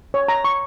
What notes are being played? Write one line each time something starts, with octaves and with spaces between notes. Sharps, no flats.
C#5
A#5
C#6